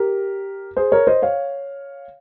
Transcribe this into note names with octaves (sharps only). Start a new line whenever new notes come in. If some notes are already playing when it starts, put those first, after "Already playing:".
Already playing: G4 A#4
G#4 C5
A#4 C#5
C5 D#5
C#5 F5